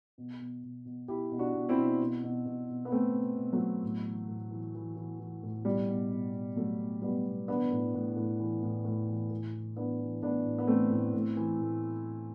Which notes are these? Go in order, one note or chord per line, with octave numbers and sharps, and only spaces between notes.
B2
B2
B2
B2
B2 E4 G4
B2
D4 F#4
B2
C4 E4
B2
B2
B2
B2
B2
B3
B2 A3 C4
B2
B2
F#3 A3
B2
A2
E3
A2
E3
E3
E3
E3
A2
B2 G3
B2
B2
B2
B2 F#3 A3
B2
B2 G3 B3
B2
E3 B3 D4
A2
A2
A2
E3
A2
A2
E3
A2
E3
E3 B3 D4
E3
A2 B3 D4
A2
B3
E3 A3 C4
A2
A2
E3
A2